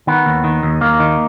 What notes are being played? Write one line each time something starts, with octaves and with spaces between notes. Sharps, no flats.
D#3 B3
D#2
D#3
D#2
D#2 A#3
D#3